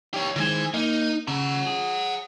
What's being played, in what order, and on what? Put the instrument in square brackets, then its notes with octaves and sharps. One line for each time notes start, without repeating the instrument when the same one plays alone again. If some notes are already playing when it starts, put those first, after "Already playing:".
[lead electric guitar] G4 C#5
[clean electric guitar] D#3 G#3 C5 [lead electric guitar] E3 G#5
[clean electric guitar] A#3 [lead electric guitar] D#4
[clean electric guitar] C#3 [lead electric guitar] F#5 A#5
[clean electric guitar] G#4